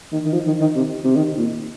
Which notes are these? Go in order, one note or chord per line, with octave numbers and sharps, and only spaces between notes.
D#3
D#3
F3
D#3
D#3
C3
C3
D#3
A#2